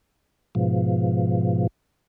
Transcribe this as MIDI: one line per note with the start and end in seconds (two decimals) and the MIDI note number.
0.55 1.67 44
0.55 1.67 47
0.55 1.67 53